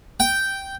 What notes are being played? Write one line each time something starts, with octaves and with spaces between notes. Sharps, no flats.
G5